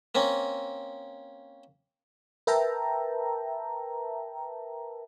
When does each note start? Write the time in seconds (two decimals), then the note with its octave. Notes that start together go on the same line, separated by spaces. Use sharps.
0.15 A#3 C4 C#4
2.47 A#4 B4 E5 G5 A5 A#5